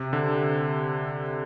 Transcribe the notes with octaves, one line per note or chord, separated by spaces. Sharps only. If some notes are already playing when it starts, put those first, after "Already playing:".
Already playing: C3
D3